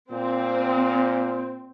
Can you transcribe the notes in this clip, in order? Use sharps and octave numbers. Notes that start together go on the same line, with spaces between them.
A#2 C4